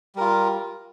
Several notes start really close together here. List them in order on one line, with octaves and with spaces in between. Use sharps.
G3 A#4 F4